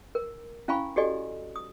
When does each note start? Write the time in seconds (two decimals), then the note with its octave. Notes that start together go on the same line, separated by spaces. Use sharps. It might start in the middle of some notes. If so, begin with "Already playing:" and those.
0.15 A#4
0.68 C#4 E4 F5 G#5 B5 C#6
0.96 F#4 G4 A4 D5 D#5 G#5
1.56 D#6